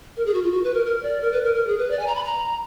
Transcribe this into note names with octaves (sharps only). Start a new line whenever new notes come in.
A#4
G#4
F#4
F4
F#4
B4
A#4
A#4
D5
A#4
B4
A#4
A#4
G#4
B4
D5
G#5
A#5
B5
A#5